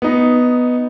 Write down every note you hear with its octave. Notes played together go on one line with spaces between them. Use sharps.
B3 D#4